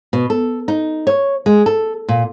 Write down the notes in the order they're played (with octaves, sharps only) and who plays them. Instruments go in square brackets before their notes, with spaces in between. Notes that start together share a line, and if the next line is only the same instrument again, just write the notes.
[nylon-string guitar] B2
A4
D#4
C#5
G#3
A4
A#2